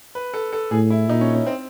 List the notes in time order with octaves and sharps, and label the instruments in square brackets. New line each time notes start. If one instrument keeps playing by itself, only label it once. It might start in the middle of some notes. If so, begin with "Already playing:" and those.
[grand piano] B4
A4
A4
[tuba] A2 [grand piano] G#4
[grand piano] E4
[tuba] A#2 [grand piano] D#4
[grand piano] C#4
C#4
C4